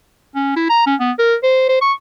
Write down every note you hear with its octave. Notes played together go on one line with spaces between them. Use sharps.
C#4
E4
A#5
C#4
B3
A#4
C5
C5
C#6